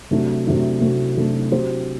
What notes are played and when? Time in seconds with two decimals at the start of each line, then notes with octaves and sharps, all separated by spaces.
0.11 C3 F#3 A3 D4 F#4
0.47 C3 F#3 A3 D4 F#4
0.81 C3 F#3 A3 D4 F#4
1.17 C3 F#3 A3 D4 F#4
1.52 F#3 C4 G4 C5